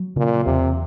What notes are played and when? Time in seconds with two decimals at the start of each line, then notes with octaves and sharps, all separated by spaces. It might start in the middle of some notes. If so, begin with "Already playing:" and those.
Already playing: F#3
0.16 A#2 C#3
0.45 E2 C3